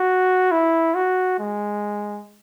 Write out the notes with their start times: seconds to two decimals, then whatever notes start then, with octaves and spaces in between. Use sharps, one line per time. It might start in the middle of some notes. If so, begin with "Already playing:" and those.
Already playing: F#4
0.52 E4
0.95 F#4
1.39 G#3